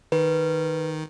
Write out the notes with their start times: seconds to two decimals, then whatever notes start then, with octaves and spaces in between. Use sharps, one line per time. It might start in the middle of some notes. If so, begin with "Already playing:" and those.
0.12 D#3 B4